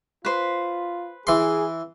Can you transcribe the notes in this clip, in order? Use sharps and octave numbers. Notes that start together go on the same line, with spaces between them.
F4 B4 C5
E3 G#4 C6